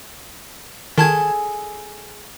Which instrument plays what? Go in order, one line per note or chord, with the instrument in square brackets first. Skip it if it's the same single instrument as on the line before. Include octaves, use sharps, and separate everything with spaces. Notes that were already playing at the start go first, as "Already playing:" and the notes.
[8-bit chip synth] D#3 A5 G#6 [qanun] G#4 A4